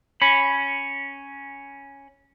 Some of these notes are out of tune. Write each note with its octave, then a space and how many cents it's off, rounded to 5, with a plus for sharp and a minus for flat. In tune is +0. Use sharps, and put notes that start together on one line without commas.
C#4 +0 B5 +0